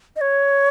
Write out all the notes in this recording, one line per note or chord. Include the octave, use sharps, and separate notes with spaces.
D#5
C#5